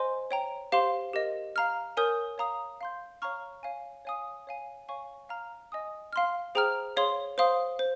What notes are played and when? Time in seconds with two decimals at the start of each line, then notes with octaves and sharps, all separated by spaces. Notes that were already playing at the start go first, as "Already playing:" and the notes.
Already playing: C5 D#5 G#5 C6
0.31 C#5 G5 A#5
0.72 G4 C5 F5 C6
1.13 G4 A#4 D#5
1.56 F5 A#5 F6
1.97 A#4 C#5 G#5 D#6 G6
2.38 C#5 F5 A#5 D#6
2.81 F5 C6 G6
3.22 C#5 F5 A#5 C#6 F6
3.63 C#5 F5 G#5
4.05 C#5 F5 G#5 D#6
4.47 C#5 F5 G#5
4.89 C#5 F5 G#5 C#6
5.29 F5 A#5 F6
5.72 D#5 G#5 D#6
6.13 F5 C6 F6
6.55 G#4 C5 G5 A#5 F6
6.97 G#4 C#5 F5 C6
7.38 C5 F5 C6 D#6
7.79 C5